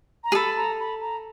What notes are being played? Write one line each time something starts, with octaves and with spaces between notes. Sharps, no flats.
A#5
G#4
A4 B5
A#5
B5
A#5